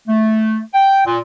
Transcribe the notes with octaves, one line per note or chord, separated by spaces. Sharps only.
A3
G5
A#2